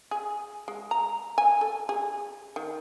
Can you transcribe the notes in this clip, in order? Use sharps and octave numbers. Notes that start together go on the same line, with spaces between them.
G#4
G#3
A#5
G#5
A4
G#4
D#3